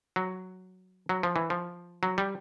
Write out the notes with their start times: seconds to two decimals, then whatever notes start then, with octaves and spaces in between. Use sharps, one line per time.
0.16 F#3
1.09 F#3
1.23 F3
1.36 E3
1.50 F3
2.03 F#3
2.18 G3